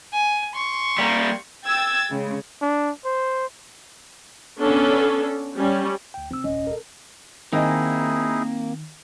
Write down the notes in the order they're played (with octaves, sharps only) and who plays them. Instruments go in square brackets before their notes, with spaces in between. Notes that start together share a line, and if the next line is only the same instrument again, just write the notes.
[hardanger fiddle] G#5
C6 C#6
[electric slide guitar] G3 A#3
[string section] G5 E6 G#6 A6
C#3 G#3
[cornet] D4
C5
[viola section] B3 C#4 D4 A4
G3 C#4
[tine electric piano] D2 G5
[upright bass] C3 [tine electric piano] C4 E6
[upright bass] D#1 C2 [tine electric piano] C#4 [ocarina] D#5
[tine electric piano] A4 A#4
[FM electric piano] D#3 [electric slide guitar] A#3 [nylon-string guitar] C4 D#5 G#5 [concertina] D#4 E4 G#4